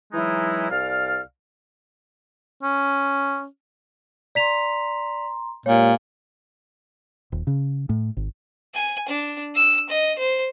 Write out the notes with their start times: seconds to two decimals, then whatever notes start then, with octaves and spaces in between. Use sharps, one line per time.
0.13 E3 F#3 G#3 D#4 E4
0.70 C2 D5 F5 F6
2.63 C#4
4.35 D5 A#5 C6 B6 F7
5.66 A#2 G#3 G4 C#5
7.32 D#1
7.47 C#3
7.89 A2
8.17 G#1
8.74 G#5
9.08 D4
9.55 E6
9.89 D#5
10.18 C5